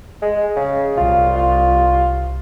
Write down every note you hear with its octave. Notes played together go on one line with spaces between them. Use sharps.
G#3
C#3
C2 F4
F4